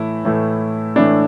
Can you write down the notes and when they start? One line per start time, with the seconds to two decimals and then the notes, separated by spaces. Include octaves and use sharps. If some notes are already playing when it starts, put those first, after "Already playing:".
Already playing: A2 E3 A3 E4
0.25 A2 E3 A3
0.96 A2 E3 A3 D4